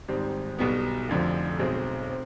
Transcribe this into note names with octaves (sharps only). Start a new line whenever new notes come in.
G#1 G#2 G3 C4
B1 B2 G3 B3
F1 F2 D3 F3
B1 B2 G#3 C4
C4